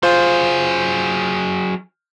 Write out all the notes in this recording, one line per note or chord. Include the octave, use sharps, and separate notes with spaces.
F#3 F4 G#4 C5